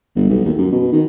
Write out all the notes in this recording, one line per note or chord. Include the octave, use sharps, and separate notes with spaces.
G1
B1
D#2
F#2
B2
D#3